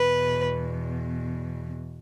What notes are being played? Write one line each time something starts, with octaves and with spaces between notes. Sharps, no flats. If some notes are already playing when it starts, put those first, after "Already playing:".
Already playing: E2 B2 B4